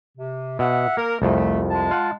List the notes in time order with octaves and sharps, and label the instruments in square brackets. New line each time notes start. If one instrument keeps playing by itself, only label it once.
[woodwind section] C3
[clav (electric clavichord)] B2 [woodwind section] E5 F#5
[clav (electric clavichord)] A#3 [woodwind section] A#4
[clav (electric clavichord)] C2 F2 [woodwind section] A3
[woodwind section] G#3 A5
[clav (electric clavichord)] F4 F#5